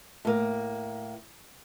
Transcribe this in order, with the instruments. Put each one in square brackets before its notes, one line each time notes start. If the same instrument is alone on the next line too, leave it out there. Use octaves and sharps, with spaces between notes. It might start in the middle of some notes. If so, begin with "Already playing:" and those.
[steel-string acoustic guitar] A2 A#3